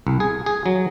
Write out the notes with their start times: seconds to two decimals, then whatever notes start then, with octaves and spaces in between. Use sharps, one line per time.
0.07 C2
0.20 G#4
0.46 G#4
0.66 F#3